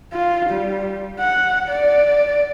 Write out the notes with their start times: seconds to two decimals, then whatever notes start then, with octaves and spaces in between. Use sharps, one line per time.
0.13 F4
0.50 G3
1.20 F#5
1.69 D5